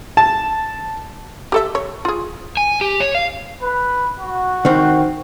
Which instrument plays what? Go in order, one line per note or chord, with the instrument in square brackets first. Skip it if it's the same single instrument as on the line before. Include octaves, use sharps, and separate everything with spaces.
[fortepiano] A5
[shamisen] G4 A4 E5
C#5
F4 G#4
[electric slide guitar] G#5
G4
C#5
F5
[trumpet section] B4
F#4
[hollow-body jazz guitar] D#3 C4